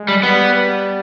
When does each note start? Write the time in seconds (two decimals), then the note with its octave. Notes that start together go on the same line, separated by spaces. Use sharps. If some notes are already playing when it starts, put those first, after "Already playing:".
Already playing: G#3
0.08 G3
0.23 G3 B3